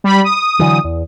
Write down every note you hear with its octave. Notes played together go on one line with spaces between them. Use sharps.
G3 B5
D#6
D3 E3 F#3
E2